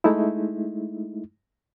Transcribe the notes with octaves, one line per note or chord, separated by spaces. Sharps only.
G#3 A3 D#4 E4